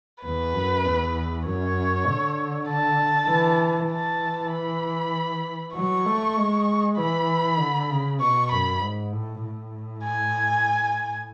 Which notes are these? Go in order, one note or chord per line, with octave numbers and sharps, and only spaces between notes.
E2 B4
F#2
E2
F#2 C#5
D3
A5
E3
E3 A5
B5
F#3 C#6
A3
G#3
E3 B5
D3
C#3
B2 C#6
F#2 B5
G#2
A2
A2
G#5